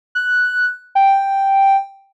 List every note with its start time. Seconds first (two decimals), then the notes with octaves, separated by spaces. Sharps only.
0.15 F#6
0.95 G5